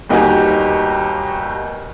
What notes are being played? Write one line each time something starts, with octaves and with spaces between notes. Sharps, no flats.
G1 D#2 D#4 F#4 G4 G#5